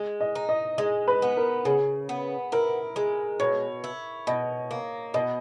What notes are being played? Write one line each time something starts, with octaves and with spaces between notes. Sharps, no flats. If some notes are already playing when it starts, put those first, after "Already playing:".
Already playing: G#3
D#5
D#4
D#5
G#3 D#5
B4
B3
A#4
C#3 G#4
B3
E4 A#4
G#3
B2 C#5
E4
B2 D#5
A#3
B2 D#5